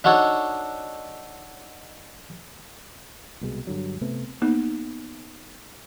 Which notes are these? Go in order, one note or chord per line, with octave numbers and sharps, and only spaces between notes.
D4 D#4 F#4 A4 C#5
C2 B2 G3 G#3
G2 D3 F#3
C3 A3 B3
A#3 B3 D#4